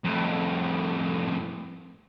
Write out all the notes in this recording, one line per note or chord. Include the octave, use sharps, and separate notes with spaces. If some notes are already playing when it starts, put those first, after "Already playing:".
F2 A2